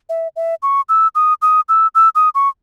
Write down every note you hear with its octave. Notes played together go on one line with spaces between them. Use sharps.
E5
E5
C#6
E6
D#6
D#6
E6
E6
D#6
C#6